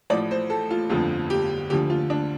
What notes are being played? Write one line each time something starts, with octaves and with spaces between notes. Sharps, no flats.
A1 A2 F3 D5
C5
A4
F4
G1 F2 D3 F3 F4
G4
D2 D3 F3 G4
F4
D4